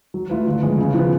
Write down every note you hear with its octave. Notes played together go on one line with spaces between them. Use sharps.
F#3
A3 F4 B4
D3
F3 G#3 B3
C#3
F3 B3